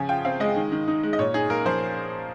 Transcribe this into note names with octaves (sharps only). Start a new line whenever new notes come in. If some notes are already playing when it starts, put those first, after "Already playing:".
Already playing: C#3 F3 G#5
F4 G5
C4 F5
G#3 D#5
D#3
D#3
D#4
G#3
D#5
A#2 C#5
D#4 G#4
A#3 A#4
F3 C5